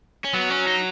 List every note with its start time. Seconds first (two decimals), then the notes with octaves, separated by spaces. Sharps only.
0.25 C#4
0.34 F#3 B3
0.50 C#4
0.67 D#4